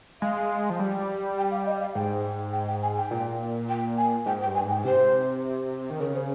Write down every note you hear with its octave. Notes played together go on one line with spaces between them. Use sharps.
G#3 F5
F3
G3
G5
F5
D#5
F5
G#2 G5
G5
G5
G#5
G5
A#2
G5
G#5
G#2 G5
G5
G2
G#5
G#2
G5
C3 C5
D#3
C#3 A#4
C5